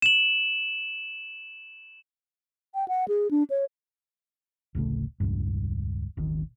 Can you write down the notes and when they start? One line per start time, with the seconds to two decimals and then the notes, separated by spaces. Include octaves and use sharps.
0.02 E7 F#7
2.75 G5
2.88 F#5
3.08 G#4
3.31 D4
3.50 C#5
4.75 D1 A1 C#3 A3
5.20 E1 C#2 G2
6.17 D#1 G#1 D#3